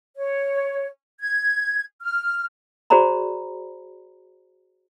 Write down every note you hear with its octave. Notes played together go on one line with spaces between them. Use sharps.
C#5
G#6
F6
F#4 G#4 C5 D5 A#5 B5